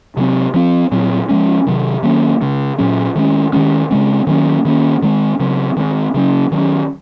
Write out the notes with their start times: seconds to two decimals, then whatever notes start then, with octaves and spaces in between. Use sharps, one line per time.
0.17 C3 F#3 C4
0.54 F3 C4
0.92 A#2 F#3 C4
1.29 F3 G#3 C#4
1.67 C3 D#3 F#3
2.03 D#3 F#3 A#3 C#4
2.41 C#3 G#3 C#4
2.78 A#2 F#3 C#4
3.15 D#3 G#3 C#4
3.53 D#3 G#3 C#4
3.90 C#3 G#3 C4
4.27 D#3 F#3 A#3 C#4
4.65 D#3 A#3 C#4
5.02 D#3 G#3 C4
5.39 C#3 F#3 C4
5.76 D#3 G#3 C4
6.14 C#3 F#3 C#4
6.52 D#3 F#3 A#3 C#4